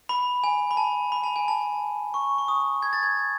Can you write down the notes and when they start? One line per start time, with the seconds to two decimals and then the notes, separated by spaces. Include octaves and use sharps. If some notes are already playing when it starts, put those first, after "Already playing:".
0.09 B5
0.44 G#5
0.71 B5
0.77 A5
1.12 B5
1.24 A5
1.36 G#5
1.48 A5
2.14 C#6
2.38 C#6
2.48 D#6
2.82 G#6
2.93 A6
3.03 G#6